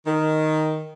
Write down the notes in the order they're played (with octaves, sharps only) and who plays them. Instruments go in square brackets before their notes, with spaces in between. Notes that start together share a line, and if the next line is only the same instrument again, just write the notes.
[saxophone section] D#3